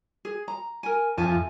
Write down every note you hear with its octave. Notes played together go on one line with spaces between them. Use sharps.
G#4
A#5
A#4 G#5
F2 E5 G#5 A5